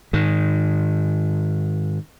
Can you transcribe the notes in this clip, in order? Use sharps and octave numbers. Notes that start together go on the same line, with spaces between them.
G#2 D#3